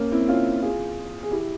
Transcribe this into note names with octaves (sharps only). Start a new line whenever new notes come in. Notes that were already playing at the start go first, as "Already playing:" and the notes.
Already playing: A#3 C#4
C4 E4
C#4 F4
F4 G#4
G#4
E4 G4